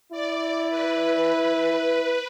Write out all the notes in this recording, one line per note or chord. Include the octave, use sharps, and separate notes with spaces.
E4 D5
B4